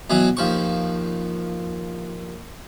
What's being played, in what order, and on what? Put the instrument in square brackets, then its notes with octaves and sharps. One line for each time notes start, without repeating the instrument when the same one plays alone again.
[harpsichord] B2 E3 F#3
D#2 F3 C#6